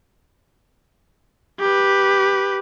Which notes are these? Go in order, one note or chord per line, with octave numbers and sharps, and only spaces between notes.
G4 B4